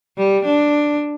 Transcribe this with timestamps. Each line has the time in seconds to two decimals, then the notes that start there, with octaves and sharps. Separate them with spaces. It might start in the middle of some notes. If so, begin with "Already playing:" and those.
0.17 G3
0.46 D4